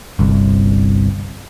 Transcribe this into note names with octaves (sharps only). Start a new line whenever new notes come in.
G1 C2